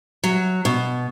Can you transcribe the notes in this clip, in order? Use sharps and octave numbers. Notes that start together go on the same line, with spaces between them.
F#3
B2